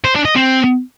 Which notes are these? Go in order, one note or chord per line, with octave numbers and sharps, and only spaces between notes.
C5
D4
D#5
C4